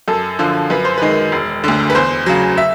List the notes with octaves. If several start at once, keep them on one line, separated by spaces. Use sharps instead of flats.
F#2 A4
D3 F3
F#2 B4
C5
D#3 G#3 B4
E1
D2 D3
B4
E2 C5
C#3 F#3
E5